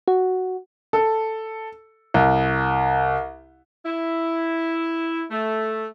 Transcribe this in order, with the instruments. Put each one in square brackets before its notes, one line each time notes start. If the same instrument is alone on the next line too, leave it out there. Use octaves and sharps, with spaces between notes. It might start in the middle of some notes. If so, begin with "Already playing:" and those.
[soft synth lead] F#4
[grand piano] A4
C2
[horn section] E4
A3